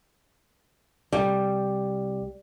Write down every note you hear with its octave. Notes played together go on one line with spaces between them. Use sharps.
C2 G3